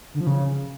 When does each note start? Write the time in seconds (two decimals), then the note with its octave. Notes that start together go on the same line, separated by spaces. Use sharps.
0.14 D3
0.21 F3
0.27 C#3